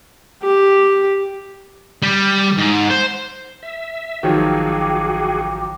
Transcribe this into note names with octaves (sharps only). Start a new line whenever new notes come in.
G4
G3
G#2
C5
E5
A1 D#3 F3 F#3 F#4 G#4 G5 D6